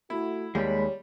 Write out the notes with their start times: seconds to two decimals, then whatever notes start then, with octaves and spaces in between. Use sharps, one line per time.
0.10 A3 E4 F#4
0.55 D#2 G3 G#3 C#5 B5